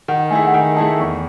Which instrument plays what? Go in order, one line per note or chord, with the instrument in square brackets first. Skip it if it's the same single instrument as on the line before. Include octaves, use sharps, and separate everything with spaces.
[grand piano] D#3 [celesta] F#5
[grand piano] A3 E4 G#4 [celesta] G#5
[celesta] F#5
[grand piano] D#3 [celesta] G#5
[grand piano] A3 E4 G#4 [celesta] A5
[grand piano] E2 [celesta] C#6